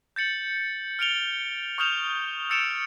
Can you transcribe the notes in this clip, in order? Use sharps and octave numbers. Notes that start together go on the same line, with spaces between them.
G6 A6 C#7 F#7
F6 C#7 D7 F7 G7
C#6 D#6 F6 G6 E7 F7
E6 A6 C#7 D7 E7 F7